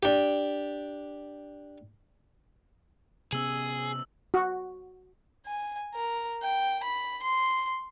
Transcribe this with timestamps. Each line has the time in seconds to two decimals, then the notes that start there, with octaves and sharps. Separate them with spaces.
0.03 D4 G4
3.32 C3 B3 C#4 G#4 E6 F#7
4.34 F#4
5.46 G#5
5.94 A#4
6.42 G5
6.83 B5
7.22 C6